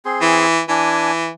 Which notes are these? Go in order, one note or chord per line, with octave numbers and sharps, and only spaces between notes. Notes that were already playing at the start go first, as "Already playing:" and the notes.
C4 G#4 C6
E3
E3 D4 G#5